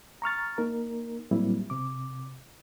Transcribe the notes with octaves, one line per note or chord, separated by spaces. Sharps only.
A#5 C#6 F6 A6
A#3 D#4 A#4
A2 F#3 G3 A#3 C4 E4
C3 D6